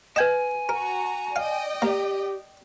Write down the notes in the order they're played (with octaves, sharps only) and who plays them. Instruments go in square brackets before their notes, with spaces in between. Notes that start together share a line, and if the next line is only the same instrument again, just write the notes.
[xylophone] B4 G#6 E7 [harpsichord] D#5 G5 [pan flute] G#5
[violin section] F#4 A#5 [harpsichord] A#4
[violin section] D5 D#5 G5 [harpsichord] F5
[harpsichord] A#3 [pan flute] G4